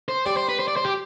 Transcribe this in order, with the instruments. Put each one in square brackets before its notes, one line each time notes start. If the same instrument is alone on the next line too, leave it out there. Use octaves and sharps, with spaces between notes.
[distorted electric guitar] C5
[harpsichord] G3 [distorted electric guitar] D5
[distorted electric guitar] C5
B4
C5
D5
C5
G4